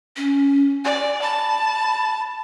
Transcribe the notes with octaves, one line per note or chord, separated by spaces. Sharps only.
C#4
D5 G#5
A5 B5